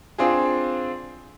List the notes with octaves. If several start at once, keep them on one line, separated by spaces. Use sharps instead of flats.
C4 D4 F4 G#4